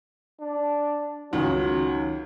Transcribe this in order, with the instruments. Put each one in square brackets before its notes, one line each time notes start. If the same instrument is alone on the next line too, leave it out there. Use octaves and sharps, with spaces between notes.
[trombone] D4
[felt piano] C#2 [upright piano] D#3 [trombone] F#3